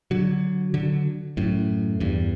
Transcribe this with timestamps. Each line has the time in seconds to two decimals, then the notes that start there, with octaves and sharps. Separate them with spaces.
0.11 D3 F#3
0.74 D3 F#3
1.37 F#2 A2
2.00 E2 G2